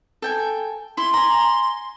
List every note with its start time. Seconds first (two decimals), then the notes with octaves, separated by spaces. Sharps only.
0.22 A4 G5 G#5
0.97 E4 C6
1.14 G#5 A#5